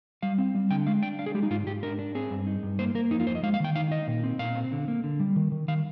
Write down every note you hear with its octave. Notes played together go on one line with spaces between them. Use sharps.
G3 F5
C4
G3
D3 G5
G#3 F5
D4 G5
D4 F5
G#4
G#3 G4
D#4
G#2 F4
G#2 G4
D4 A#4
D4
C4 G#4
G2
D#4
G2
A#3 C5
A#3 A#4
F2 D#4
F4
F2 C5
D#5
G#3 F5
F5
D#3 G5
D#4 F5
D#4 D#5
A#2
C4
A#2 F5
C4
D3
A#3
D3
G3
D#3
D#3
D#3 F5